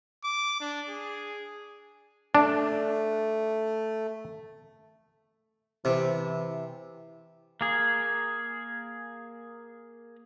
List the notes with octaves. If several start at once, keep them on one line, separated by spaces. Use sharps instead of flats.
D6
D4
G#4
A3 D4
C3 E3 C5
A#3 G#4